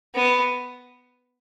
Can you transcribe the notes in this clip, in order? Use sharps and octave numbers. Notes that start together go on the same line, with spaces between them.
B3